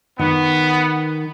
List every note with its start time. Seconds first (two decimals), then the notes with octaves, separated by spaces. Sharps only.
0.19 D#3 B3